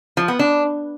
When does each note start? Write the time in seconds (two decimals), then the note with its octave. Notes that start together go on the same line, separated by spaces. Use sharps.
0.17 F3
0.28 B3
0.39 D4